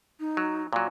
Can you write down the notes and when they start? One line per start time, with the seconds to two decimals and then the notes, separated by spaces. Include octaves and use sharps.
0.20 D#4
0.37 F#3
0.73 A#2 F#3